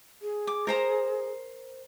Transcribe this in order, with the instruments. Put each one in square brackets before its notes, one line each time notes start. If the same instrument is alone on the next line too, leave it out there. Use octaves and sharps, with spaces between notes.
[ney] G#4
[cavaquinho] D6
A#4 C5 A#5